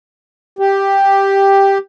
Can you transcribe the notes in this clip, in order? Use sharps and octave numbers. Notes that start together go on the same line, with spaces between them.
G4